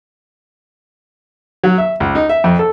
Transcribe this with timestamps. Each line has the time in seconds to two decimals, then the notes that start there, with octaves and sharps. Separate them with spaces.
1.64 F#3
1.78 E5
2.00 C#2
2.15 D#4
2.29 E5
2.44 F2
2.59 A4